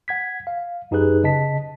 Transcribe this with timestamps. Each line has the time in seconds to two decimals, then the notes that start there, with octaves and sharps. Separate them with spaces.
0.08 F#5 G#6 B6
0.47 F5
0.91 F#2 D#4 G4 G#4 B4 F#6
1.24 C#3 D#5 A5 B6